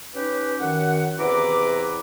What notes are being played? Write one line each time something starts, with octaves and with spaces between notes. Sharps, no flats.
C#4 D#4 G4 B4
F#2 D#3 F#5
E2 C3 E4 B4 A#5 D6